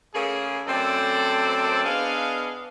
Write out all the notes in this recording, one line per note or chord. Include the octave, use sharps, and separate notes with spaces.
C#3 A3 A#3 G#4
F#2 A3 C4 A4 D5 A5
B3 D4 G#4 D#5 F5